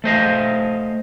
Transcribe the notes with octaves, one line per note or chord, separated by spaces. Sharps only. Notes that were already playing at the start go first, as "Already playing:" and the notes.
A3 C5 D#5 F5